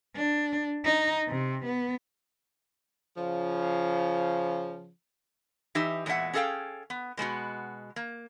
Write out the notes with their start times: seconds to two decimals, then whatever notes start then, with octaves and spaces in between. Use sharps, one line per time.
0.15 D4
0.85 D#4
1.28 C3
1.65 B3
3.16 C#3 F3
5.75 E3 D#4 G4 E5
6.06 E2 A#2 G#3 D4 E5 F#5
6.33 C#4 G#4 A4 D#5 F5 G5
6.90 B3
7.17 B2 G#3 B3 F#4
7.96 A#3